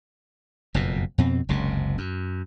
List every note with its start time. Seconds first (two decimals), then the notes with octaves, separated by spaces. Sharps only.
0.74 F#1 F2 B2
1.18 F2 B2 C4
1.49 F#1 C#2 C3
1.98 F#2